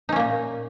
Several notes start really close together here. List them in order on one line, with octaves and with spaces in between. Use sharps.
D#4 C#4 A#3 A#2